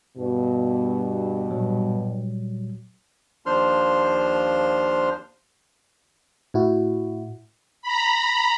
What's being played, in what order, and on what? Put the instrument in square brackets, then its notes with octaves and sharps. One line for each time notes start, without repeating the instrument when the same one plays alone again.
[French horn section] G2 B2
[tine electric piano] A#2 F#3 G3
[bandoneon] D#2 F3 D4 C5 C6 F6
[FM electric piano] A2 E4 F#4
[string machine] A#5 B5